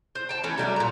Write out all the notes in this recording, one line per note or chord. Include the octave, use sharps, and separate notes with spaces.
C5
G5 A5
E3 A3 C#4
F#3 G3 A3 D4
A#2 A#5